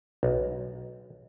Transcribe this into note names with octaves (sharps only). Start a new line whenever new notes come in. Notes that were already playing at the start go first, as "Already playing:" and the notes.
B1